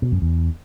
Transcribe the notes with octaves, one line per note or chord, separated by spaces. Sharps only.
B2
F#2
E2